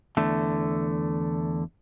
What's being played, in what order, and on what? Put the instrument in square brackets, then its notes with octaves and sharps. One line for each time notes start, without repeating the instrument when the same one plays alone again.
[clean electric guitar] E2 D3 A3